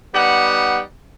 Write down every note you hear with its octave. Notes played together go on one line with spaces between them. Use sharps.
G3 B3 D#4 F#5